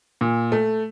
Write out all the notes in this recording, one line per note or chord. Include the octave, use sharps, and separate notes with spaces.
A#2
A3